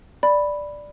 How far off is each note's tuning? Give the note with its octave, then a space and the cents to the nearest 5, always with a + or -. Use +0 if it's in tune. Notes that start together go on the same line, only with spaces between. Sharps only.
D5 +0 B5 +0